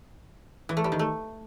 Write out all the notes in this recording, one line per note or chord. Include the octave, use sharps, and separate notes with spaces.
E3
A3
G3
D#3
A3